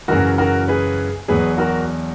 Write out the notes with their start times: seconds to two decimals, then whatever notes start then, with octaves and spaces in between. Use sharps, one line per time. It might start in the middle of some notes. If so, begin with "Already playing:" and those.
0.08 F#2 C#3 E3 F#4 A#4
0.38 F#4 A#4
0.68 G#4 B4
1.28 E2 B2 F#3 G#4 B4
1.58 F#4 A#4